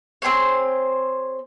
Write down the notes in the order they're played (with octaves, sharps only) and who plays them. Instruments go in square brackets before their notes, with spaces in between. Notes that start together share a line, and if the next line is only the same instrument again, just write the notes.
[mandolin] C4 G#4 C5 C#5